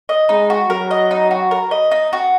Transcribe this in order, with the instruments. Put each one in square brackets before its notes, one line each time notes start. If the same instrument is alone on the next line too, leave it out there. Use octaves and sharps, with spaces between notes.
[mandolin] D#5
[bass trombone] G#3 [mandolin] D#4
[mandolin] F#4
[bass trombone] F#3 [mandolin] A#4
[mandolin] D#5
D#4
F#4
A#4
D#5
D#4
F#4